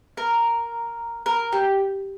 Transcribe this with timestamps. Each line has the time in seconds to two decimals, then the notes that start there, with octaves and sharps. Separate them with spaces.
0.17 A#4
1.26 A#4
1.52 G4